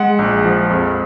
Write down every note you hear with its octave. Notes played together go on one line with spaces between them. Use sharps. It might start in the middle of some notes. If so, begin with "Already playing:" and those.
Already playing: G#3 F#5
A#1
F3
F2